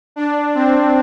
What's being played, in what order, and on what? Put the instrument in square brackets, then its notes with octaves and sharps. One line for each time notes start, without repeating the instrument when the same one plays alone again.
[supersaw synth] D4
C4